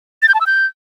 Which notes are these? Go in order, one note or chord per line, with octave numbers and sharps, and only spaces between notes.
A6
G6
A5
E6
G6